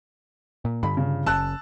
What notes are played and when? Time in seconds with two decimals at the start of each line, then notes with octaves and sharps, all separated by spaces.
0.65 A#2
0.83 G2 D3 B5
0.97 C#3
1.26 F#1 C#3 A5 E6 F#6